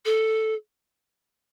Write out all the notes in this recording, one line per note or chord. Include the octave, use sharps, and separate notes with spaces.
A4